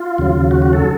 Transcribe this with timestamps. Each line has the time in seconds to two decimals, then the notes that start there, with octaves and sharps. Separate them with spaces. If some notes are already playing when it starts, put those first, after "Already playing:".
Already playing: F4
0.18 D#2 C#3 F#3
0.51 F#4
0.62 F#4
0.73 A4